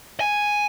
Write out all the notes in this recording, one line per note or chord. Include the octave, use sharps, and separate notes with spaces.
G#5